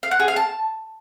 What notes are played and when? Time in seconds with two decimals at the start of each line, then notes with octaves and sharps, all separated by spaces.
0.03 F5
0.11 F#5
0.20 G#4
0.28 F5
0.36 A5